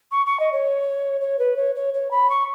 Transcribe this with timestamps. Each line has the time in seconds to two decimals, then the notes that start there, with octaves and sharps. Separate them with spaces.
0.12 C#6
0.26 C#6
0.39 D#5
0.52 C#5
1.21 C#5
1.39 B4
1.57 C#5
1.75 C#5
1.94 C#5
2.11 B5
2.30 C#6